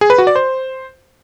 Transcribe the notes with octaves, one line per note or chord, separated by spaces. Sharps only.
G#4
B4
F#4
D5
C5